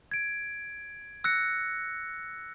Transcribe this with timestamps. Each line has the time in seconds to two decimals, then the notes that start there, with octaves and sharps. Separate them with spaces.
0.11 G#6 D7
1.24 E6 F#6 A#6 C#7